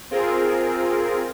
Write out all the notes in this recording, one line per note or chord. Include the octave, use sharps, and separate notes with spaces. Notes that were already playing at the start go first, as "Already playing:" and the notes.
C4 F4 G#4 A#4